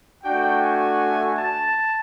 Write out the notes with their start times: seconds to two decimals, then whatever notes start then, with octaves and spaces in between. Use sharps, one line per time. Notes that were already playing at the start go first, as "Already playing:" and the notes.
0.23 A3 D4 F#4 G5
0.62 G#5
1.37 A5